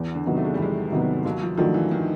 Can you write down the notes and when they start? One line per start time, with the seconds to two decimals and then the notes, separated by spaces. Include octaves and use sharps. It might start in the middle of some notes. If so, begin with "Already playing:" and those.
Already playing: E2
0.15 D3
0.26 C3 D#3 F#3 B3
0.37 A3
0.45 G#3
0.54 G3
0.58 E2 G#3
0.92 C3 D#3 F#3 B3
1.25 D#2 F#3
1.42 F3
1.57 D#3 F3 F#3 A3 D4
1.74 E3
1.91 D#3